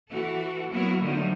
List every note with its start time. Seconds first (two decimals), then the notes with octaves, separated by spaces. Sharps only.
0.11 E3 F#4 A4
0.71 F#3 A#3 B3 E4 F#4 A#4
1.01 D3 D#3 F3 F#3 A3 D#4